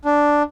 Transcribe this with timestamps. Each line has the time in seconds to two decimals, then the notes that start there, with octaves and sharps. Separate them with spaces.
0.05 D4